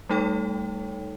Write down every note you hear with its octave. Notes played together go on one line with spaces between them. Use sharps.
G3 A3 D#4 A4 C#5 G5